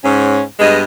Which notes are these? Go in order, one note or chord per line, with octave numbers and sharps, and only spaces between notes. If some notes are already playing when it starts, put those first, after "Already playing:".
G#2 C#4
G2 G#3 B3 D#5